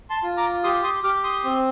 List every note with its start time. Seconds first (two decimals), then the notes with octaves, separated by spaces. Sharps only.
0.10 A5 C6
0.23 F4
0.37 A#5 D6
0.64 G4 C6 D#6
0.84 C6 D#6
1.04 G4 D6 F6
1.24 C6 D#6
1.44 C4